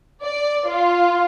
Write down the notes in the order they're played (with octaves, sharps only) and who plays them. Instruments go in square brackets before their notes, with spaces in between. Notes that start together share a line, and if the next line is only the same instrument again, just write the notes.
[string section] D5
F4